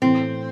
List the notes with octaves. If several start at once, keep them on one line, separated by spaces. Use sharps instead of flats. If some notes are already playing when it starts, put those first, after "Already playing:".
A2 E3 A3 C4